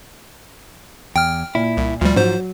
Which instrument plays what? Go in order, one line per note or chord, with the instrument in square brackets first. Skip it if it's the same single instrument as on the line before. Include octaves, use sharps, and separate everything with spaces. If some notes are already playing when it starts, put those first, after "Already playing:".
[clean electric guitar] E2 [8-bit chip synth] G5 F6
[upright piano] A#2 [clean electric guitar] E4
[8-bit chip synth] C2
[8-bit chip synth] D2 G3 [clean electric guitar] F3
[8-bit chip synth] G#2 C5 [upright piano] F#3